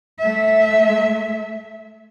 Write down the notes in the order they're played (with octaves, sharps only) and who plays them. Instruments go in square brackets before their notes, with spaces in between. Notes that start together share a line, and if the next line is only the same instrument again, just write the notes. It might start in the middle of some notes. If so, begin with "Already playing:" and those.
[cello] A3 E5